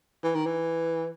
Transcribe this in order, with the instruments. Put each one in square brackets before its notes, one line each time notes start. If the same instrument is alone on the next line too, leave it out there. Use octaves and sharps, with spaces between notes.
[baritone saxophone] E3
D#3
E3